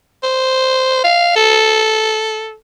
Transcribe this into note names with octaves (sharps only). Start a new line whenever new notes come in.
C5
F5
A4